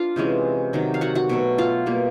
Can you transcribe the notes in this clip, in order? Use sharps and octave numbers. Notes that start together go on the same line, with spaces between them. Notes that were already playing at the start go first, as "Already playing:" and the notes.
Already playing: D4 F4 F5
C3 E3 G#3 C#4
C3 D#3 F#3
F5
F#4 F#5
F#4 F#5
B2 F#3 A3
F4 F5
B2 G3 A#3